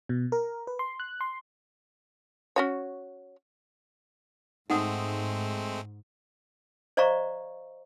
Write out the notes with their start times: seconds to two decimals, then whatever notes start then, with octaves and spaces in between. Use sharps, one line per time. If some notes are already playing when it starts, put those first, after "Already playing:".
0.09 B2
0.32 A#4
0.67 B4
0.79 C6
1.00 F#6
1.21 C6
2.56 C#4 F#4 C#5
4.70 G#2 G#3 A3 C4 D#4 F#5 D#6
6.97 C5 D5 D#5 F5 A#5 C#6